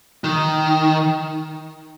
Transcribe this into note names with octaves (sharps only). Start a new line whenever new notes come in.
D#3